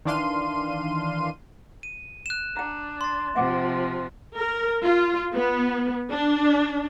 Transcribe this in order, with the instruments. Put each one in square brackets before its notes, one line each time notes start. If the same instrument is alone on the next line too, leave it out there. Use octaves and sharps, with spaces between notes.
[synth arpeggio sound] D#3 E3 D4 F5 C6 D#7
[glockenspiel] D#7
F#6 E7
[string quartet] D4 [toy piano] G5 A#5
[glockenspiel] C6 A6
[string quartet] C3 F3 [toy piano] E5 F#5 D6
[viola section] A#4
F4
B3
D4